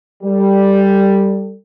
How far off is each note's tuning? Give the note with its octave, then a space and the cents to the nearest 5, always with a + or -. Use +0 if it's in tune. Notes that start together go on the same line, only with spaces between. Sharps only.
G3 +0 A4 +25